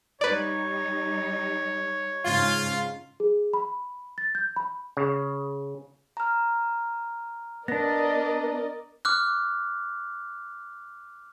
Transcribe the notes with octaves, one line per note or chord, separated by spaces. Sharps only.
G3 D#4 B4 C#5 D5
G#2 C#3 F4
G#4
B5
A6
G6
B5
C#3
A#5 F6
B3 D4 A#4 D5 D#5 A#6
D6 F6 F#6